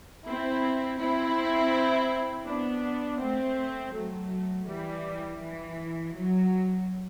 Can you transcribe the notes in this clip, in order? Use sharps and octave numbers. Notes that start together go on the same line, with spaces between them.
C4 E4
C4 E4
B3 D4
A3 C4
F#3 A3
E3 G3
E3
F#3